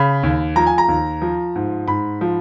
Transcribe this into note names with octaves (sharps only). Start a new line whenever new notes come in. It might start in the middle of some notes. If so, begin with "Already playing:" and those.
Already playing: C#3 B5
D#2
F3 A#5
G#5
A#5
D#2
F3
G#2
G#2 B5
F3